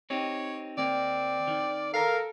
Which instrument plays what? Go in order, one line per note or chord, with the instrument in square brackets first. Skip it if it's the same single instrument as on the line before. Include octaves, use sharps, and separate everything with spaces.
[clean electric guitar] C4 D#4 G4 [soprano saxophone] C#5
[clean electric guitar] D#2 A#3 [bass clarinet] C4 [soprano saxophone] D5
[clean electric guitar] D#3
[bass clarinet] A4 [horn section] A#4 [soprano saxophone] F5